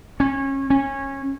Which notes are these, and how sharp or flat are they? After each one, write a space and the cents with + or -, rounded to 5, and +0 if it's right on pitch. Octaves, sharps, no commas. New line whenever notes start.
C#4 -25
C#4 -20